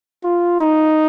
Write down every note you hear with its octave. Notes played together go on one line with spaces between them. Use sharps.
F4
D#4